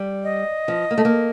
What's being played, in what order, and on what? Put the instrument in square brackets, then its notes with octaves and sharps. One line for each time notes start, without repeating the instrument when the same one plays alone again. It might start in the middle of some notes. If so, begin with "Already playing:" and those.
Already playing: [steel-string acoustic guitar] G3
[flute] D#5
[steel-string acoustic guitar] F3
A#3
A3
A#3